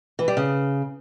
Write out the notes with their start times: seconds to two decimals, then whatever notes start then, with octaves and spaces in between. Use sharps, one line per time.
0.19 E3
0.28 G3
0.37 C#3